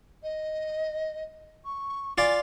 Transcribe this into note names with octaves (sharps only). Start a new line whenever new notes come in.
D#5
C#6
F4 D5 G#5